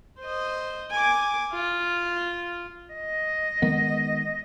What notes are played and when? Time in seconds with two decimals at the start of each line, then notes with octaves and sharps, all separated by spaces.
0.20 C5 D#5
0.91 G#5 D6
1.53 F4
2.94 D#5
3.62 D#3 G#3 B3